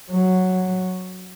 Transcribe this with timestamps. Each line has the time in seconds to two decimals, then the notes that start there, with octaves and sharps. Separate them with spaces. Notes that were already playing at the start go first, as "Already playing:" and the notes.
0.11 F#3